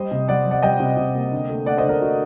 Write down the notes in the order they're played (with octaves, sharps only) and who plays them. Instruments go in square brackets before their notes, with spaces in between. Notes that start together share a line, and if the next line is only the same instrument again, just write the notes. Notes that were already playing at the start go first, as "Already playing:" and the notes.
Already playing: [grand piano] G3 C5 D#5
C3
G3 D5 F#5
G3
D5 F#5
G3 D#5 G5
C3
C3
A#3
D3
A3
A3 D5 F#5
C5 D#5
D3
A#4 D5
D3 F#4